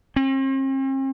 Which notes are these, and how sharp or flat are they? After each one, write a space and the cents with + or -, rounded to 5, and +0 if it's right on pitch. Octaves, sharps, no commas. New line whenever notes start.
C4 +45